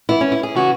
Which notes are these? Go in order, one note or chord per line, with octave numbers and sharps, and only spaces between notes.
E3 B3 E4
C#4
E4
G#4
C#3 E3 C#4 F#4